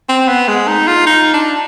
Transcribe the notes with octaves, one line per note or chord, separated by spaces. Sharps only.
C4
B3
G#3
D#4
F4
D#4
D4